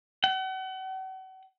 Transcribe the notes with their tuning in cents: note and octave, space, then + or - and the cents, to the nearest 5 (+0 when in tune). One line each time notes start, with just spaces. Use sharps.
F#5 +40